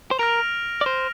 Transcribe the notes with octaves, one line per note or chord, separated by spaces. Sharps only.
C5
A#4 F6 A#6 D7 F7
D5
C5